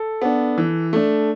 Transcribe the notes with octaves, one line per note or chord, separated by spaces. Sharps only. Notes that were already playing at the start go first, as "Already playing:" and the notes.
Already playing: A4
B3 D4
E3
A3 D4